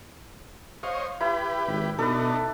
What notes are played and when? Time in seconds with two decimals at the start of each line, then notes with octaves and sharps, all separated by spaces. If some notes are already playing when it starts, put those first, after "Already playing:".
0.83 C5 C#5 D#5 F5
1.20 E4 G4 B4
1.67 G#1
1.99 B2 D4 D#4 A4 B4